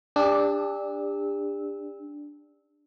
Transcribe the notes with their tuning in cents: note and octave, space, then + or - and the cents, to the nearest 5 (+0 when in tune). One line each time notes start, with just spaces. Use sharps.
D4 +0 G4 +40 E6 -20